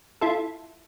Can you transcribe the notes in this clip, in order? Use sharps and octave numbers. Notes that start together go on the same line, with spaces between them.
E4 F4 A4